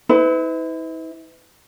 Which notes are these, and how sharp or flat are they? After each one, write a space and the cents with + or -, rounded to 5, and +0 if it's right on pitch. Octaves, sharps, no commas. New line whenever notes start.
E4 -40 B4 +35